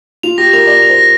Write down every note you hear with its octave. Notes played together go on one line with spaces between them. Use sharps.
F4 F7
G4 A#6
A#4 F7
D5 A#6
F7
C5
A#6